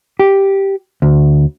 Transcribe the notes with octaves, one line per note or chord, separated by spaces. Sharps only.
G4
D2